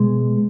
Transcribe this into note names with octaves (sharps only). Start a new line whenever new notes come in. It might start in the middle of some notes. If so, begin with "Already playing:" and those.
Already playing: B2 G#3